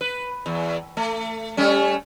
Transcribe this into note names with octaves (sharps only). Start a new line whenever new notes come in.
B4
E2
A3
G3 A3 C#4